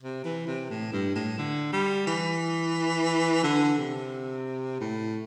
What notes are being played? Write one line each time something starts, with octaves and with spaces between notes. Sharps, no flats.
C3
E3
C3
A2
G2
A2
D3
G3
E3
D3
C3
A2